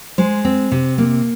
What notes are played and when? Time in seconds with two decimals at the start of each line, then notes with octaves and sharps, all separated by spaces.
0.18 G#3 C5
0.45 C4
0.72 C3
0.98 A#3